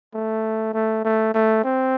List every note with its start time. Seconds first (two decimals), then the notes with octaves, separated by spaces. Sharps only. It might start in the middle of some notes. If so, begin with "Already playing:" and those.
0.14 A3
0.74 A3
1.05 A3
1.34 A3
1.64 C4